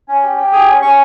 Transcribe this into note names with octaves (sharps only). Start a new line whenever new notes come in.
C#4
G4
G4
G#4 D#6
C#4
C#4 C#6